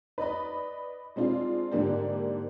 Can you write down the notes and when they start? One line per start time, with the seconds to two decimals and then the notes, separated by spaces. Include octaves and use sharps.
0.18 B4 D5 D#5 B5
1.16 G#3 C4 D4 F4
1.72 G#2 D3 A#3 D4 G4